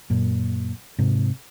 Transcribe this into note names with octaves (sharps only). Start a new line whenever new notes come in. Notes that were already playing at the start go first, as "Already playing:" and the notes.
F#2 A#2
G#2 C3